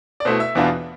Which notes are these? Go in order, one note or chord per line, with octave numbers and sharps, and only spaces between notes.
D5
B2 A3 E4 C5
E5
E2 B2 B3 D4 F4